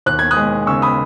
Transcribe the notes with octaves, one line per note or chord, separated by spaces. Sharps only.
D#2 F#6
G#6
D#6 F#6
G#3
C#3 C#6 E6
B5 D#6